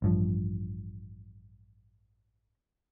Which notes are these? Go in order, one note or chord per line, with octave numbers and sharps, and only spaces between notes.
A1 G2 F3